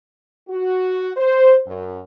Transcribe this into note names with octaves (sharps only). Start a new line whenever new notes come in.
F#4
C5
F#2